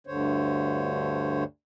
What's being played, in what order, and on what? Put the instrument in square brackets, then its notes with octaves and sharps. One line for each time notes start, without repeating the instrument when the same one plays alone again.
[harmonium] D2 G2 D3 C5 C#5